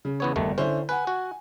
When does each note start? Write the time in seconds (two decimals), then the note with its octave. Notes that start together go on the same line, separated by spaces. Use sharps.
0.05 C#3
0.20 E2 B3 C#5
0.36 G1 D#2 D#3 A3
0.58 D3 C#4 E4 C5
0.89 B4 F#5 G#5
1.07 F#4